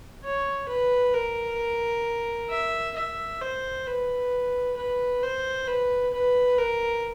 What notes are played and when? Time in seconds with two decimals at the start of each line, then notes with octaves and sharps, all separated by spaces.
0.24 C#5
0.68 B4
1.14 A#4
2.50 E5
2.96 E5
3.41 C5
3.87 B4
4.76 B4
5.23 C5
5.67 B4
6.13 B4
6.58 A#4